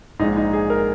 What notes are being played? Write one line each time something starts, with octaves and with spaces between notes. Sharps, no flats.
A#1 G#2 G#3 D#4
D#4
G#4
A#4